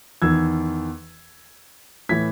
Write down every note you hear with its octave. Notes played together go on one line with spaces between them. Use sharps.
E2 D#3 E6 G#6
A2 E3 G#6 B6